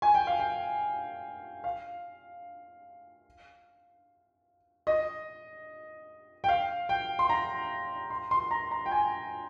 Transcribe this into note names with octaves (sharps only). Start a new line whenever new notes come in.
G#5
G5
F5
G5
F5
D#5
G5
F5
G5
C6
A#5
C6
C6
A#5
A#5
G5
G#5